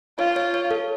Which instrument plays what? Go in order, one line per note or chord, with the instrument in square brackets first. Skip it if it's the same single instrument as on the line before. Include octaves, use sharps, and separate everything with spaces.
[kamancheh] F4 [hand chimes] C#5
[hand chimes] C#5
C#5
A4